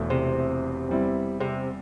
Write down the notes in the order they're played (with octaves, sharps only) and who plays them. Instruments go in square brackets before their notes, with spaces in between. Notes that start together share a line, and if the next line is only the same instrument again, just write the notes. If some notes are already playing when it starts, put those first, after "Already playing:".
Already playing: [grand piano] E1 E2 E3 A3 E4
[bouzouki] C3
[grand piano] E2 E3 G3 C4 E4
[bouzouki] C3